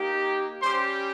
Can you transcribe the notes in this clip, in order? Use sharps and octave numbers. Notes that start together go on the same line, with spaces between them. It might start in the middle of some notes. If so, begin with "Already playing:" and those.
Already playing: A#3 D#4 G4
G3 C#4 G4 C5 C6